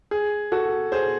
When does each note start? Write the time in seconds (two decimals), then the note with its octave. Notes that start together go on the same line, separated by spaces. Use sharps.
0.11 G#4
0.52 F#4 A4
0.92 G#4 C5